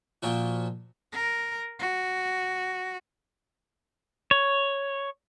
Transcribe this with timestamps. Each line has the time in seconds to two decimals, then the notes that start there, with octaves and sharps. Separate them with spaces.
0.22 A#2 F3 F#4
1.12 A#4
1.79 F#4
4.31 C#5